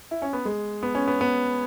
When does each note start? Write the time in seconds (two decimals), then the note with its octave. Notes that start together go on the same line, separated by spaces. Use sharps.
0.11 E4
0.22 C#4
0.33 B3
0.45 G#3
0.83 B3
0.95 C#4
1.08 B3
1.21 B3